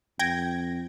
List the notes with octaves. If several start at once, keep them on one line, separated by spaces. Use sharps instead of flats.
F2 G5 G#6 A#6